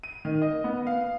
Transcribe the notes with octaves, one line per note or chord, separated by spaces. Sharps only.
D#7
D#3
D#5
B3
F5